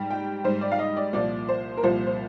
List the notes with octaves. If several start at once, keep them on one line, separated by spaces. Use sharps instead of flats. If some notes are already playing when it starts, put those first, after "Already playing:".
Already playing: G#2 G3
G5
G#2 G3 C5
D5
F5
D#5
D5
C2 A#2 F3 D5
C5
A#4
C2 A#2 F3 C5
C5